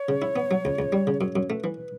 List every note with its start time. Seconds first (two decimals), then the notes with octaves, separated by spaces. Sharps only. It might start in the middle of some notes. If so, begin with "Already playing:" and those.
Already playing: C#5
0.09 C#3
0.22 E4
0.36 B3
0.51 F#3
0.65 C#2
0.79 C#2
0.92 G3
1.07 C#3
1.21 F#2 C#5
1.36 F#2
1.50 A3 B4
1.64 E3